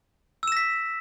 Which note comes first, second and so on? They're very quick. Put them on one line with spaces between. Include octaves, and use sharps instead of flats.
E6 E7 A#6 B6